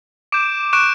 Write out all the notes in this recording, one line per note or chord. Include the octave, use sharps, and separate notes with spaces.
D6 G6 D7 E7
C#6 F#6 D7 E7